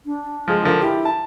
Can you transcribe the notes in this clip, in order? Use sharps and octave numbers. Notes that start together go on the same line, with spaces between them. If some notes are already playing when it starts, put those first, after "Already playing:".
D4
F3 G#3
D3 F3 A#4
E4 G4
A5